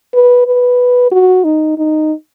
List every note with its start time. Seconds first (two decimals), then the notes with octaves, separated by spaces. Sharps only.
0.14 B4
0.47 B4
1.12 F#4
1.44 D#4
1.78 D#4